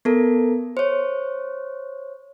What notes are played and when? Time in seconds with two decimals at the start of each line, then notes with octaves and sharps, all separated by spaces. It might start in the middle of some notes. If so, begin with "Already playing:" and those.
0.05 B3 A4 A#4
0.77 C5 C#5